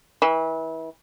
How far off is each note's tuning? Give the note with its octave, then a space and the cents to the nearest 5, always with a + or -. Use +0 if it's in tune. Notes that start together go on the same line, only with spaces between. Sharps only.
E3 -30